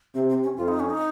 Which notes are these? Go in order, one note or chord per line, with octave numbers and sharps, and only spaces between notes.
C3 C4
C4
C#4
F2 F4
D#4
C#4
D#4